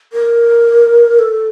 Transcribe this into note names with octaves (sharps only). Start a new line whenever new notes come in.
A#4
A4